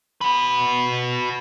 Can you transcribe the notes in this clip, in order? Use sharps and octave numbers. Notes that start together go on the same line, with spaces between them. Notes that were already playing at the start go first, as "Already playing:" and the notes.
F#4 B4